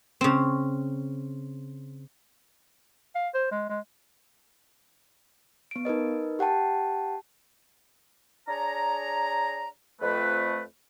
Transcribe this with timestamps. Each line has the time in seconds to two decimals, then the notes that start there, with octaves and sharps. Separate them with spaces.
0.21 C#3 C4
3.16 F5
3.34 C5
3.52 G#3
3.69 G#3
5.71 B3 D7
5.85 D#4 A#4 B4 D#5
6.39 G4 F#5 G5 A5
8.48 D4 G#4 C#5 A#5
10.02 F2 A3 B4